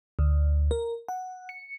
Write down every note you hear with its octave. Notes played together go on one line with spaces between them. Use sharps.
D2
A#4
F#5
C#7